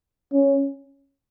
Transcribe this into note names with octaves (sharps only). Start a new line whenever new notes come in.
C#4